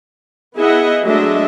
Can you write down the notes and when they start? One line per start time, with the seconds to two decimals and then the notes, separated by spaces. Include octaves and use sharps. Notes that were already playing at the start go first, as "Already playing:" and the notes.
0.58 B3 E4 G#4 D#5 E5 F#5
1.03 F#3 G#3 A3 D4 D#5 E5